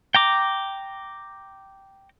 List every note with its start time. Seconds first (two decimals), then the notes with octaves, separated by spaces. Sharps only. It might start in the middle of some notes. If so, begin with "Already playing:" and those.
0.15 G5 A#5 D6